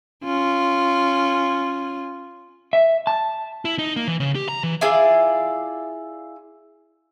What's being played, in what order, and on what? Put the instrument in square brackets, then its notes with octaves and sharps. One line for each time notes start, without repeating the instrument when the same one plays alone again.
[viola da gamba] C#4 F4
[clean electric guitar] E5
A5
[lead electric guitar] E4
D#4
A#3
E3
C#3
G4
A#5
E3
[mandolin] E4 F4 G#4 D5